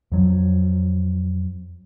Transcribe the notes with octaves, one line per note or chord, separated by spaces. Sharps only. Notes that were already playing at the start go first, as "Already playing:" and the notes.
F2 F#3